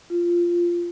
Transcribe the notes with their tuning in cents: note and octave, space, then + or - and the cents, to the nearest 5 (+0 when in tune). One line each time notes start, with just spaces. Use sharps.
F4 -10